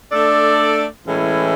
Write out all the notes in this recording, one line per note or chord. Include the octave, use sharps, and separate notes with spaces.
A3 D4 A4 D5
A2 E3 G#3 C#4 E4